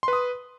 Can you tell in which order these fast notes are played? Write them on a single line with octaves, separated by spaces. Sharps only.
C6 B4 D#6